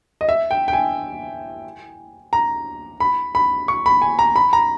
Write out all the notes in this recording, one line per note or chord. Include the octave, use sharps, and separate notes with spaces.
D#5
E5
G5
G5
G#5
A#5
B5
B5
C#6
B5
G#5
A#5
B5
A#5